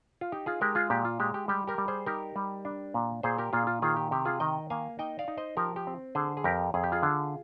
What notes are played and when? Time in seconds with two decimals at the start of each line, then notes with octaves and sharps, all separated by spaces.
0.21 F4
0.32 D#4 G4
0.46 F4 G#4
0.61 G#3 G4 A#4
0.75 F4 G#4
0.90 A#2 G4
1.05 F4
1.20 G#3 G4
1.34 G4
1.48 G3 G4
1.68 G4 A#4
1.78 G3
1.88 G#4 C5
2.06 D#4 G4 A#4
2.36 G3
2.65 D4
2.94 A#2
3.23 A#2 G#4 C5
3.38 G4 A#4
3.53 A#2 F4 G#4
3.67 F4
3.82 D#3 F4 G#4
3.96 G4
4.11 C3 G4
4.25 F4 G#4
4.40 D#3 D#5 G5
4.70 A#3 F5 G#5
4.99 D#4 D#5 G5
5.19 D5 F5
5.28 D#4
5.37 C5 D#5
5.57 F3 G4 A#4
5.76 G4
5.87 C4
6.15 D3 G#4 C5
6.37 G#4
6.44 F2 G4 A#4
6.74 F2 G#4
6.84 G4
6.92 F4 G#4
7.03 D3